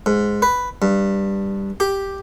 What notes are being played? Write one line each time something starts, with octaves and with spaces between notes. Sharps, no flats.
G#2
B4
G2
G4